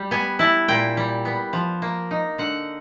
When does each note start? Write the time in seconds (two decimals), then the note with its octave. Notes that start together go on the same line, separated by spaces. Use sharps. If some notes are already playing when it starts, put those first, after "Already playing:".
Already playing: G3
0.11 B3 G#5
0.39 E4 A5
0.68 A#2 G5
0.97 G3
1.25 B3
1.53 F3
1.82 A#3
2.11 D#4
2.38 D3 F#5